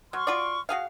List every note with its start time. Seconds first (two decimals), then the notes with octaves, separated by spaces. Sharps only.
0.13 F#3 C6 C#6 F6
0.27 F4 F#4 D5
0.69 F#4 G#4 F5